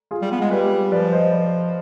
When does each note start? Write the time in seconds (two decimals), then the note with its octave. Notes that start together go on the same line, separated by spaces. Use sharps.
0.11 F4 G#4
0.22 G3
0.31 B3
0.41 G#3
0.51 G3 G4 B4
0.92 F3 B4 D5
1.13 C5 D#5
1.32 B4 D5